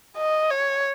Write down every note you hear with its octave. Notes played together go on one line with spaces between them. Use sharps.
D#5
C#5